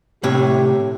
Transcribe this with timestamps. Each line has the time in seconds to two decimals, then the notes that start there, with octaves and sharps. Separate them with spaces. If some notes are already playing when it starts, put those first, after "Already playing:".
0.23 A2 C3 G4 C#5